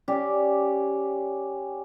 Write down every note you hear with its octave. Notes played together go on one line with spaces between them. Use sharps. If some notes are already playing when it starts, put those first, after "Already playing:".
C#4 G4 D5